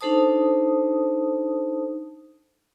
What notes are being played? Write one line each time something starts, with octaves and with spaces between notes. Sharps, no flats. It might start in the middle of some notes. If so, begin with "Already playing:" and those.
D4 D#4 A4 C5 A5 D#6